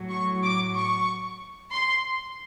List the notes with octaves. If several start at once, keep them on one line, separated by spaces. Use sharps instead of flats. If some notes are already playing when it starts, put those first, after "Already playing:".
Already playing: A2 F#3
C#6
D6
C#6
C6